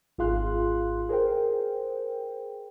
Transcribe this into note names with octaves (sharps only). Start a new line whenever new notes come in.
G#1 F4 G#4 F5 C6 F#6
G#4 A#4 C5 G5